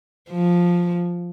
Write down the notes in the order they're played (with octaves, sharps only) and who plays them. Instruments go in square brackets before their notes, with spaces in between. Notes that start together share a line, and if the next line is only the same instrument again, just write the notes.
[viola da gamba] F3